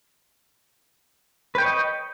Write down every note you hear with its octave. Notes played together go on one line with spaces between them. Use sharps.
B4 C#5 D#5 G5